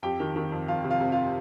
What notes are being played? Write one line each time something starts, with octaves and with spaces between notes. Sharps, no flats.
F2 G4 G5
D#3
D#3
F2
F2 F4 F5
C3
F4 F5
C3
F4 F5